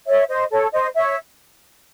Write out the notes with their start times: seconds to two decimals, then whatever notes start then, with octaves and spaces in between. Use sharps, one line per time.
0.07 C#5 E5
0.29 C5 D#5
0.51 A4 C#5
0.73 C5 D#5
0.95 C#5 E5